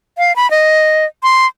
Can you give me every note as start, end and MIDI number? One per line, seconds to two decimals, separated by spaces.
0.18 0.35 77
0.36 0.50 83
0.51 1.05 75
1.23 1.46 84